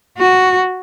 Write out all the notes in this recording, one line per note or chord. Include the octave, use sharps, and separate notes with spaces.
F#4